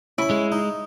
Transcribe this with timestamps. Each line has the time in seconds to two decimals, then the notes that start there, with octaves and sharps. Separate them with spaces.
0.18 C#4 E4 B5
0.31 G#3
0.52 D#4